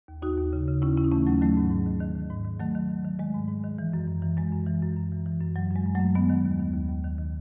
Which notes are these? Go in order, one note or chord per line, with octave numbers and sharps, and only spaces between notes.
D#2
D#2 D#4 F#4
D#2
C#3
C#3
D#2 C#4 E4
C#3 C#4 E4
D#4
E3 A3 C#4
D#2 F#3 A3
D#3 F#3 A3
G#2
G#2
D#3
D#3
D#3
G#2
D#3
D#3 F#3 A3
D#3
D#3
D#3
D#3 G#3
G#2
G#2
D#3
E3
F#2
F#2
E3
F#2 G#3
F#2
E3
F#2
F#2
E3
E3
F#2
E3 F#3
F#2 G#3
F#2
F#3 A3
F#2
D#3 G#3 B3
D#3
D#2
D#3
D#2
D#2
D#3
D#3